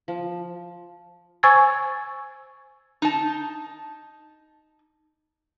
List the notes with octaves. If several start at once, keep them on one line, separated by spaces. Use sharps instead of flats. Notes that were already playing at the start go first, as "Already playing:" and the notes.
F3
C5 G#5 C#6 E6 G#6 A6
D#4 A5